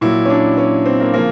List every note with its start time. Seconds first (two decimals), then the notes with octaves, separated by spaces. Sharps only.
0.01 A#2 F#3 E4
0.25 C#4
0.30 D4
0.57 C#4
0.86 C4
1.00 A#3
1.14 C#3 F3 A#3